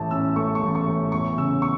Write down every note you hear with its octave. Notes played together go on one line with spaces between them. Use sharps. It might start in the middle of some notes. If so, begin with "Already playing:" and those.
Already playing: A1 A2 A5
C#4 E6
A3 C#6
C#6
A1
C#6
A2
E2 C#6
C#3 E6
C#6